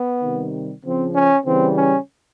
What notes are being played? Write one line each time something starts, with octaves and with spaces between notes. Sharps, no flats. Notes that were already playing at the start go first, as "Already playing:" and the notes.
Already playing: B3
C3 D#3 G3
C#3 F3 C4
C#4
C#3 E3 G3 C4
C#4